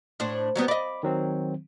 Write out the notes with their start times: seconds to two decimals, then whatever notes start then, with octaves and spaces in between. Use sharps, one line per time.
0.20 A2 D4 C5
0.56 F#3 G3 B3
0.68 D5 D#5 B5 D6
1.03 D#3 F#3 C4